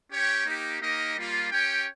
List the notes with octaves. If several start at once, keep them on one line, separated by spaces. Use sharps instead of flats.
C#4 G4 C#5 G5
A#3 D#4 G4
A#3 D#4 G4 A#4 D#5
G3 A#3 F4
C#4 G4 C#5 G5